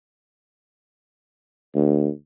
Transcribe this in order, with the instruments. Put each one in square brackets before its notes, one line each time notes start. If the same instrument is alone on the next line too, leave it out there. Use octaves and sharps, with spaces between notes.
[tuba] D2